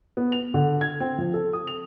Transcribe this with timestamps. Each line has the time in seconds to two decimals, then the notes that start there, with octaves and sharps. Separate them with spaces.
0.17 B3
0.32 F7
0.54 D3
0.81 G#6
1.00 C4
1.19 F3
1.34 A4
1.53 D#6
1.67 F7